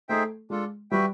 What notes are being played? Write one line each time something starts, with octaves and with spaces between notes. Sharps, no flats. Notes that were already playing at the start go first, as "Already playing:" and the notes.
A3 D#4 G#4 C5 E5 G5
G#3 D4 F4 A4
G3 F#4 B4 E5 G5